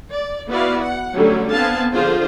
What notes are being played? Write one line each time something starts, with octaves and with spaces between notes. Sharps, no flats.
D5
B3 E4 F#4 B4 D5 F5
F#5
D3 F#3 G3 A3 C#4
B3 C4 F5 G#5 A5
D3 F3 F4 G#4 C5